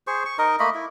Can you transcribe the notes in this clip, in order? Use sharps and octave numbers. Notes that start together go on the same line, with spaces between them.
G#4 C5 C#6
C#6
D#4 A#4 D#5
A3 A#3 D#5 B5
E4